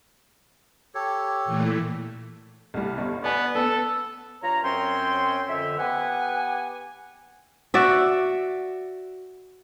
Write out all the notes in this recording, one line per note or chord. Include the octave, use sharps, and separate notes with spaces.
G4 A4 C#5
A#2 E3 A3
C2 G3
G1
B3 D5 G#5
B3 A4
G2 F4 C#5 A#5
F#2 C4 C#4 C#5 G5 C6
F2 D3 E5
B3 G4 F#5 G#5
F#4 D5 E5